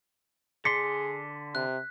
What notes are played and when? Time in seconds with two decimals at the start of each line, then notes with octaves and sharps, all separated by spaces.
0.65 D3 G#4 D5 C6 B6 C#7
1.55 C3 F#6